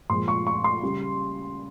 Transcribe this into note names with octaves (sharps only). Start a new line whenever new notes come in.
A#2 F3 G#3 C6
C#6
C#6
C6
C#3 G3